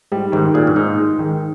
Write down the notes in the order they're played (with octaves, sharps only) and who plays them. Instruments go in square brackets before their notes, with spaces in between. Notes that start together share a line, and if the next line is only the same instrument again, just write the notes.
[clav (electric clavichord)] G#2 [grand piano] G3
[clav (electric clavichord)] G#2 [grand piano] D#3
[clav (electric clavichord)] A#2 [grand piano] G#4
[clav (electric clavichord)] G2
[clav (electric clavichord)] G#2 [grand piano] D#4
[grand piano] G#3
D#3